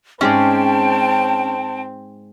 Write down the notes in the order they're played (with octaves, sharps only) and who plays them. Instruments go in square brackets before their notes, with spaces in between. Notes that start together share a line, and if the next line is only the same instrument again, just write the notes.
[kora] G#2 G#3 D5 [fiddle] C4 [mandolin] C#4 [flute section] G5 A5